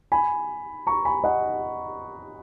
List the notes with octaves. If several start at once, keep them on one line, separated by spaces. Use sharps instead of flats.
G#5 B5
A#5 C#6
G#5 B5
D#5 F#5